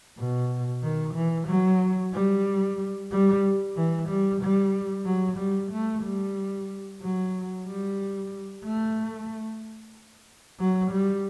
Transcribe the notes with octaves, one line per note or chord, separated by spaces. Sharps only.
B2
D#3
E3
F#3
G3
G3
E3
G3
G3
F#3
G3
A3
G3
F#3
G3
A3
F#3
G3